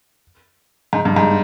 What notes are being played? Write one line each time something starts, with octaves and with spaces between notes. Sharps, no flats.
G#2
G2
G#2